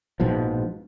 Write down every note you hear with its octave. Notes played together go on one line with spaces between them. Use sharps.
A#1 G#2 B2 F3